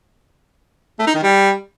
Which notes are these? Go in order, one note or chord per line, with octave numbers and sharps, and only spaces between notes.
A3
D#4
D#3
G3